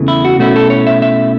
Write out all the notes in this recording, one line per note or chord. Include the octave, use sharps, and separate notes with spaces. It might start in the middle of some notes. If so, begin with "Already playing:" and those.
Already playing: E2 C#3 E3 A3
E4
F#4
B2 A3 C#4 E4 F#4
A4
C#5
E5
E5